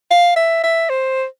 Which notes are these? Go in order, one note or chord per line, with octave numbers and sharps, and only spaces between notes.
F5
E5
E5
C5